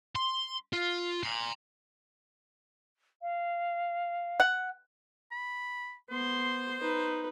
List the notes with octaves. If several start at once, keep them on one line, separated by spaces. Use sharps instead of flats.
C6
F4
A#5 C6
F5
F#5
B5
B3 C5 C6
D#4 B4